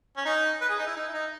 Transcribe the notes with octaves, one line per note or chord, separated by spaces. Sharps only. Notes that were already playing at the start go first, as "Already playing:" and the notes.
C#4
D#4
B4
G#4
D#4
E4
D#4
E4
D#4